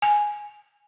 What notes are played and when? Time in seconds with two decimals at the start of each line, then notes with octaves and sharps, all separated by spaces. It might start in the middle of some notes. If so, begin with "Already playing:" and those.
0.02 G#5